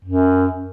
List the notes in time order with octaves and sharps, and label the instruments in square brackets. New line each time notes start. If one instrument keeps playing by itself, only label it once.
[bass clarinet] F#2